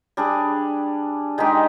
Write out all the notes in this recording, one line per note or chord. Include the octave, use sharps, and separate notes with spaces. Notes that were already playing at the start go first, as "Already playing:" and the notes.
G3 D4 G#4
D#3 G#3 D#4 G4